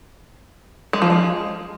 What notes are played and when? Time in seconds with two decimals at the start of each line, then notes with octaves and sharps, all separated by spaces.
0.93 G#3
1.02 F3
1.10 G#3